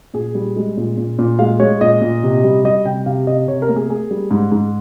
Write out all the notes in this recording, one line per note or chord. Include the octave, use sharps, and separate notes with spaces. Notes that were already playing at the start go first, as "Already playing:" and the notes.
A#2 G#4
G3
G#3
A#2
A#2
A#2
G#3 F5
G#3 C#5
A#2 D#5
A#2
C3
G3
G3 D#5
C3 G5
C3 F5
C3 D#5
C3 C#5
A#4
A#3
G#4
A#3 G#4
G3
G#2
G#2